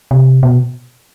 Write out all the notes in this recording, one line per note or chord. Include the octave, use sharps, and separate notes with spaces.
C3
B2